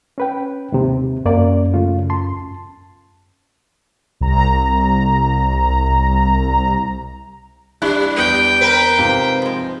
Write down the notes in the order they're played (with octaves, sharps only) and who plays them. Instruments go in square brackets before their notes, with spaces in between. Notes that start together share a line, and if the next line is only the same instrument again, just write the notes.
[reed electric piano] C#4 B4 G5
D#2 G#2 C3
[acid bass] F#2 [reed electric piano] A#3 D5
[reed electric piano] C#3 A3 F4
A5 C6
[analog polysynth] C2 A#5
[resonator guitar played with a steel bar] E3 D4 E4 [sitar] G3 [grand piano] F#6
[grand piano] E2 B3 [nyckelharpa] G5
[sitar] C4 A#4 B4
[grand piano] G#2 C3 F4 [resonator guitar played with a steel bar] G4
[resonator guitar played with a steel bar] F3 G#3